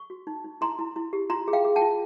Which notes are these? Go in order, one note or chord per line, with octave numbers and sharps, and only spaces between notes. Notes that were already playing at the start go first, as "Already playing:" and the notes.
Already playing: C#6
F#4
D#4
D#4
E4 A#5 C6
E4
E4
G4
F4 A#5 C6
G#4
F5 G5
G#4
G5 A5
F4